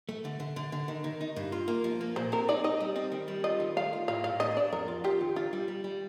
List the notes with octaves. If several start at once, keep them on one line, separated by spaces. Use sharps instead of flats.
A3
D3
D3
D3
D3
D#3
D#3
D#4
G2
F4
A#3
F3
A#3
A#2 C5
C4 A#4
D#4 D5
D#4 D#5
G3
C4
D#3
G3
F4 D#5
D#3
A3 F5
F4
A2 F5
A2 F5
D4 D#5
D4 D5
F2 A#4
F4
F4 G4
D#3
D4 F4
G3
G3
G3